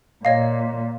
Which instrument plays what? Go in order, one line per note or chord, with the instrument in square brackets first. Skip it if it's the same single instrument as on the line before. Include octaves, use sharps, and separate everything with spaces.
[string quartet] A#2 [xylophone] C#5 D#5 F5